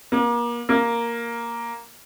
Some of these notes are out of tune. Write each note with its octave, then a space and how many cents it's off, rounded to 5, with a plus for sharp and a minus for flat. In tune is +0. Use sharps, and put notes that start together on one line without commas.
A#3 +30
A#3 +0